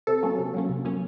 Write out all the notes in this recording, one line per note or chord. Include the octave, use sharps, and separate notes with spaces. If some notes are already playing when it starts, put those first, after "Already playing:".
C3 A4
F#3 A#3 C#4
C3
F#3 A#3 C#4
C3
F#3 A#3 C#4